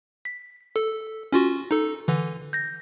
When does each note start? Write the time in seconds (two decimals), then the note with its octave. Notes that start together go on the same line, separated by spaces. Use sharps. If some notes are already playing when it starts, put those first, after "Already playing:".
0.25 B6
0.76 A4
1.32 C#4 F4 F#4
1.71 D#4 A4
2.08 D3 E3
2.53 G6 A#6